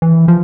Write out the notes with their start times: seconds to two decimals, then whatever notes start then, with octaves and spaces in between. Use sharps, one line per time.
0.02 E3
0.28 F3